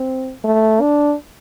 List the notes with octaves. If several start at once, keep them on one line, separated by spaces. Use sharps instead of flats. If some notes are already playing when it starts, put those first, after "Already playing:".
Already playing: C4
A3
D4